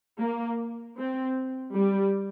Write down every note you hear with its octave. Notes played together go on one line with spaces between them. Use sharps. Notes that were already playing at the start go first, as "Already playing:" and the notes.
A#3
C4
G3